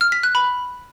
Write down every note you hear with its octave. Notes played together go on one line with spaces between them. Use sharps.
F6
B6
F#6
B5